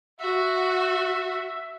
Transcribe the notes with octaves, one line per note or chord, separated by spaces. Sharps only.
F#4 E5